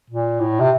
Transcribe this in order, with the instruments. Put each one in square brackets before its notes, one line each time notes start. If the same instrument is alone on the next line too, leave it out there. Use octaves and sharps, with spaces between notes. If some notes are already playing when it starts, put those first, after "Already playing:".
[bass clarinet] A#2
A2
C3